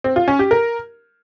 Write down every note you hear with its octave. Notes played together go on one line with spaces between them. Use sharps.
C4
F4
C#4
G4
A#4